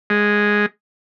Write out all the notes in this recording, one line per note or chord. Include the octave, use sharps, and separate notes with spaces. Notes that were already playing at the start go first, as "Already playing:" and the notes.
G#3